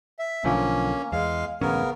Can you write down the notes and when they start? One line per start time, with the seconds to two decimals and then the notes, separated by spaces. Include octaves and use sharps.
0.19 E5
0.44 B1 D3 F3 A#3 C#4
1.12 E2 G#3 F5
1.61 E1 A1 C#3 B3 C#4 A#4